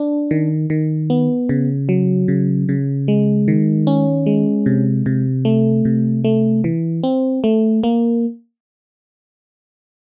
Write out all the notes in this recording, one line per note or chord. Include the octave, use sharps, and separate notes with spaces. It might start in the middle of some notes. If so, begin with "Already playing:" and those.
Already playing: D4
D#3
D#3
B3
C#3
F#3
C#3
C#3
G#3
D#3
C#4
G#3
C3
C3
A3
C3
A3
E3
C4
A3
A#3